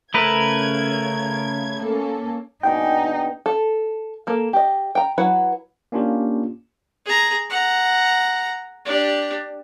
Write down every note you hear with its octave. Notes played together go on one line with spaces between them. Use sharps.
C#3 A3 A#4 B4 G#6
A#3 C#4 A4
B2 D4 D#4 G#4 G5
A4
A#3 A4
G4 D#5
G5 A#5
F#3 E4 B4 F#5
A#3 C#4 D4 F4 G4
G#4 A#5
F#5 A#5
D4 G4